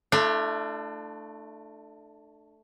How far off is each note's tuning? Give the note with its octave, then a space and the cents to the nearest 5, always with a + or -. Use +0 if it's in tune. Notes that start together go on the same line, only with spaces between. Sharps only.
A3 +0 D4 +30 F4 -40